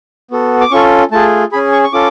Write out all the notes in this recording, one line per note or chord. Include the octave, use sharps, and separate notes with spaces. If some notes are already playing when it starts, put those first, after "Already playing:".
B3 F#4 A4
D6
C#4 F4 A4 C#6
A3 F4 G#4 A5
C#4 G#4 B5
C#6
C#6
C#4 F4 A4 D6